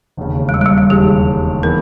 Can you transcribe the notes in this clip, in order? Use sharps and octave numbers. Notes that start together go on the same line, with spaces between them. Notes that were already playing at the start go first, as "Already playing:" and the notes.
E1 D#2 C#3
G#3
G3
G#3
G3
G#3
E1 D#2 C#3 G#3 G4
E3 G#3 B3 A#4